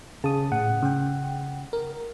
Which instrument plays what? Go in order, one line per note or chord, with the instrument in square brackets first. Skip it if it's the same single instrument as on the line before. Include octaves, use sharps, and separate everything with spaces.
[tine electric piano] C#3 [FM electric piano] A5 D#6
[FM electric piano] A2 [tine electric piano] F#5
[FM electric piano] C#3 G5
A#4